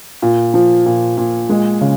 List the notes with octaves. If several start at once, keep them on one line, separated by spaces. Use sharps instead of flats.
A#2
F3
A#2
A#2
G#3
C#3